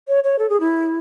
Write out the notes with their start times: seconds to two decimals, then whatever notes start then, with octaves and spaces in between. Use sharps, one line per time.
0.08 C#5
0.24 C#5
0.39 A4
0.49 G#4
0.60 E4